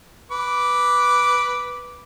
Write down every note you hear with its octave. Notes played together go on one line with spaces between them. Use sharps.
B4 D6